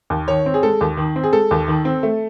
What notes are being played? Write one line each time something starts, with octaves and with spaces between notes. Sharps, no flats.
D#2
D#3 C#5
C4
G#4
G#3 A4
D#2
D#3
C4
G#4
G#3 A4
D#2
D#3
C4
A3